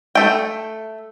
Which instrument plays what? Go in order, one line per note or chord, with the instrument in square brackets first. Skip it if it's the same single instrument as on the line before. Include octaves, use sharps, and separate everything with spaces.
[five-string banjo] A3 G5